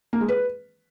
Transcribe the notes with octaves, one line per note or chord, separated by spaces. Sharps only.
A#3
G#3
B4